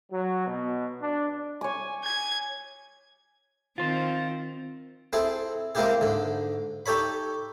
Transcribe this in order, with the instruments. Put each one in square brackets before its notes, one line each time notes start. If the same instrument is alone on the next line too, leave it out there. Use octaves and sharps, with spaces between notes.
[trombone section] F#3
B2
D4
[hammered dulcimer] C#5 D6 [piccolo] G#5
[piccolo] G#5 [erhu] G#6
[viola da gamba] D#3 C4 [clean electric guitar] F4 C5
[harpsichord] C4 E4 G#4 A4
G#3 A#3 C4 E4 G4 G#4
G#2 D3
D#4 G4 A4 C#5 B5